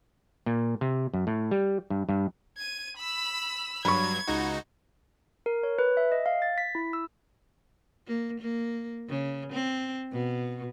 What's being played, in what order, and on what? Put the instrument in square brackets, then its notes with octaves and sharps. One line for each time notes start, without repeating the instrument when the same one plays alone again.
[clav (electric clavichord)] A#2
C3
F#2
A2
G3
G2
G2
[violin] G#6 D#7
B5 E6
[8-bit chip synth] G2 F#3 [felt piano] B5 C#6 [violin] G#6
[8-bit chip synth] C#2 D#4 F#4
[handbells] A#4
C#5
B4
E5
D#5
F5
A6
B6
E4
E6
[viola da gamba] A#3
A#3
C#3
C4
B2